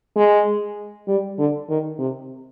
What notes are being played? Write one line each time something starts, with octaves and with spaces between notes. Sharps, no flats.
G#3
G3
D3
D#3
C3